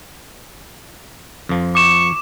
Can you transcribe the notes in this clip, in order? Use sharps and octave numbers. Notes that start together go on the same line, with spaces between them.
F2 F3
C#6 D6 E7